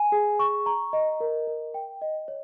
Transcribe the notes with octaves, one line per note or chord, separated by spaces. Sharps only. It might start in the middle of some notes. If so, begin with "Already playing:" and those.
Already playing: G#5
G#4
C#6
A#5
D#5
A#4
A#4
G5
D#5
C#5